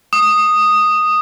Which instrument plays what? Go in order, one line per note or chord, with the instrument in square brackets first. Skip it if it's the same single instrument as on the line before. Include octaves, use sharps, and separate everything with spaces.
[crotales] D#6